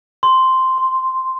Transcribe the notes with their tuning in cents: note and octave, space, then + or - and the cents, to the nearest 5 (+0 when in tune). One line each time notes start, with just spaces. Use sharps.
C6 -5
C6 +10